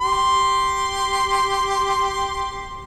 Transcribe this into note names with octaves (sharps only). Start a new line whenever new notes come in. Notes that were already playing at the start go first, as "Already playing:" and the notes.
G4 C6